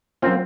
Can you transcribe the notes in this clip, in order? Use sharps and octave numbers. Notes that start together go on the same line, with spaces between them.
F#3 A#3 C4 C#4 F4